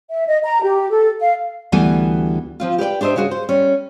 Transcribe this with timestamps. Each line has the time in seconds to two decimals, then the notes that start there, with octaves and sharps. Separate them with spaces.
0.10 E5
0.27 D#5
0.44 A#5
0.62 G4
0.90 A4
1.20 F5
1.72 D2 E3 G3 B3 G#5
2.60 F3 C4 F4
2.78 G4 B4 D5 G5
3.01 D4 G4 C5 D#5 E5
3.16 C#3 G3 F#4 G#4
3.31 C5
3.49 G3 C#4